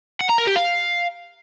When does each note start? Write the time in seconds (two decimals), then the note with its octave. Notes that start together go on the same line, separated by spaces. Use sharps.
0.21 F#5
0.29 A#5
0.38 A#4
0.47 G4
0.56 F5